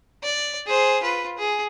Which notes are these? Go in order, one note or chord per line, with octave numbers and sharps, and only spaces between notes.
D5
G#4 C5
F4 B4
G#4